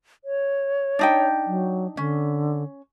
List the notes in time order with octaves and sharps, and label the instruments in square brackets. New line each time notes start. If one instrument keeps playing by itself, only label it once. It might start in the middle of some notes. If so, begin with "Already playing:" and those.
[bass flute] C#5
[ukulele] D4 D#4 G5
[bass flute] F#3
[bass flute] D3 [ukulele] C#4